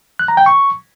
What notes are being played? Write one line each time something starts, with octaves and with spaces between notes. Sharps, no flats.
F#6
A#5
G5
C#6